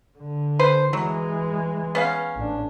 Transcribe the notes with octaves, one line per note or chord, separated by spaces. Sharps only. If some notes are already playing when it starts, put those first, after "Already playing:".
D3
B4 C5
E3 F#3 G#3
B3 C#4 F5
A1 D4